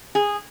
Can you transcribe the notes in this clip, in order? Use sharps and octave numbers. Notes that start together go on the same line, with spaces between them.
G#4